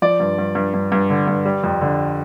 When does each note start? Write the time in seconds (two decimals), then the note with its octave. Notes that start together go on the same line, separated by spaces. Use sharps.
0.02 F3 D5
0.20 G2
0.38 G2
0.55 G2
0.74 G2
0.92 G2
1.10 D3
1.27 G2
1.45 G3
1.64 F2
1.81 D3